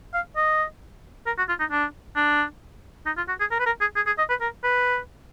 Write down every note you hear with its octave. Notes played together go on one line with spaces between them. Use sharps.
F5
D#5
A#4
F#4
F4
D#4
D4
D4
D#4
F4
F#4
G#4
A#4
B4
A#4
G#4
G#4
G#4
D#5
B4
A#4
B4